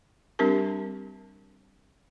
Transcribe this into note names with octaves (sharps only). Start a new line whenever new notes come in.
G3 C4 D4 G4 A#4 A5